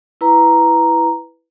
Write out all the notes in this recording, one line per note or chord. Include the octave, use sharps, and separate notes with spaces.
E4 B4 A#5